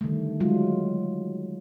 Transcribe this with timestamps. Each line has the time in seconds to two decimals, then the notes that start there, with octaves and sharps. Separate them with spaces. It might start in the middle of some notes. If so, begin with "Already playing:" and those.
0.01 D3 D#3 G3 A3
0.40 F#3 G#3 F4